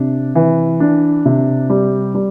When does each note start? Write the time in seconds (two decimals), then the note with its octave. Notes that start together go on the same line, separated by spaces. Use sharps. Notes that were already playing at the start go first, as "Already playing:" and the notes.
Already playing: C3 D4
0.35 E3
0.80 D4
1.26 C3
1.70 G3
2.15 G3